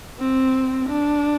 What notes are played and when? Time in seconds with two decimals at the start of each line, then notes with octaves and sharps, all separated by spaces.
0.19 C4
0.89 D4